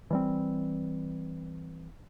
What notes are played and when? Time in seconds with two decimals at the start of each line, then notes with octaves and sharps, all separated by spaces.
0.11 E3 G3 C4